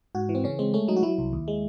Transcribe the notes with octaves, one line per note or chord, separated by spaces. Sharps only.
G#2 F#4
E3
C4
C#3 C#4
G#3 C4
A3 C#4
F#3 D#4
F#4
F#3 E4
C2
D#2
G#3